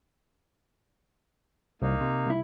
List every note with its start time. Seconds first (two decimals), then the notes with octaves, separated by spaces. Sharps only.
1.82 C2 A#3 D#4
2.01 C3
2.26 C2 E4